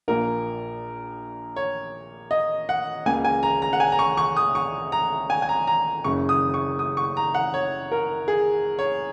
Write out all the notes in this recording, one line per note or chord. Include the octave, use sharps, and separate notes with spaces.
A#1 A#2 A#3 A#4
C#5
D#5
F#5
C#2 C#3 A#3 G#5
G#5
A#5
A#5
F#5
G#5
A#5
C#6
C#6
D#6
C#6
A#5
G#5
G#5
A#5
A#5
F#1 F#2 C#3 C#6
D#6
C#6
D#6
C#6
A#5
F#5
C#5
A#4
G#4
C#5